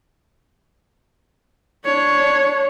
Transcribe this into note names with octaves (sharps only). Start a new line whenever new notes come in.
D4 C#5